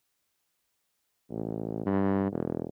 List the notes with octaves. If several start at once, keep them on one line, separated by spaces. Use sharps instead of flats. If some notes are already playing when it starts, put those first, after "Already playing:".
A1
G2
E1